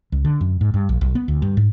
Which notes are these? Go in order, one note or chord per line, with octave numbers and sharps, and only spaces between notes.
C#2
D3
F#2
G#2
G2
A#1
B1
B3
D2
G2
G#2